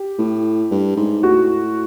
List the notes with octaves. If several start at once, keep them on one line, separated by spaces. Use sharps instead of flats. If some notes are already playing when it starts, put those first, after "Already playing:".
Already playing: G4
A2
G2
G#2
A2 F#4